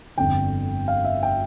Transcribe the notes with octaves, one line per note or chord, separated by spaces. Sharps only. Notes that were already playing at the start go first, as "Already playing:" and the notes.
G1 F2 D3 G5
F5
E5
G5